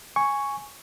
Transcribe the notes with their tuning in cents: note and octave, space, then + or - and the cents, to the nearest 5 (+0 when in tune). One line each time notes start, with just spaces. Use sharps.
G#5 +0 C#6 +0